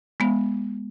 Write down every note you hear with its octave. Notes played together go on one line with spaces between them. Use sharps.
G#3 B3